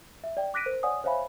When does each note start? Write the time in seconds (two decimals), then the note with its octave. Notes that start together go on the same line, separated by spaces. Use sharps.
0.24 E5
0.37 D5 G5
0.54 D6 F#6 A#6 B6 D7 D#7
0.66 A#4 C5
0.83 C#5 D5 F#5 G#5 D#6
1.04 C5 C#5 E5 F5 G#5 B5